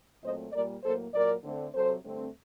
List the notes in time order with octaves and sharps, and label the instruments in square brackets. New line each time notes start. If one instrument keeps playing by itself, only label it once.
[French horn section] A#2 F#3 A3 C4 C5 D#5
A#2 G3 A#3 A#4 D5
A2 F#3 A#3 A4 C5
A#2 F#3 A#3 A#4 D5
D3 A3 C4
C3 F#3 C4 A4 C5
G2 D3 A3 C4